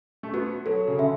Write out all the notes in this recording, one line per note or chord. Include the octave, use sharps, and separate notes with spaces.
A3
B3 F#4
F#3 A4
C#3
D3 E5